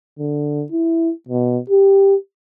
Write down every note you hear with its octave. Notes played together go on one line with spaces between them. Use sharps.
D3
E4
B2
G4